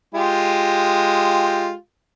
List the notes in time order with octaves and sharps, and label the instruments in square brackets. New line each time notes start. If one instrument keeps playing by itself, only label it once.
[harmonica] G#3 F4 G4